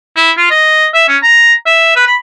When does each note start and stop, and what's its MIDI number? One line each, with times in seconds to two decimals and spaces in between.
0.16 0.31 64
0.37 0.49 65
0.50 0.86 75
0.94 1.06 76
1.08 1.17 61
1.23 1.53 82
1.66 1.95 76
1.96 2.06 71
2.07 2.15 83